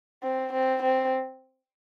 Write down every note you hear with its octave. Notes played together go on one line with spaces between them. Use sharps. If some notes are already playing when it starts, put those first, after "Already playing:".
C4
C4
C4